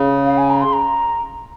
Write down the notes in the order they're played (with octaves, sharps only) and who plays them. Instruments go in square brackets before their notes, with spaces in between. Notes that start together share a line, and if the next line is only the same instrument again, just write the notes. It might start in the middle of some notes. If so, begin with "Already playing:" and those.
Already playing: [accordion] C#3
[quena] F5
G#5
A#5
C6
A#5